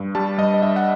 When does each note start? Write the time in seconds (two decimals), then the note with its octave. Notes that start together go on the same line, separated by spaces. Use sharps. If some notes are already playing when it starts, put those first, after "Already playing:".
Already playing: G2
0.15 G3 A5
0.38 G2 D#5
0.54 D#5
0.62 G2 E5
0.76 F#5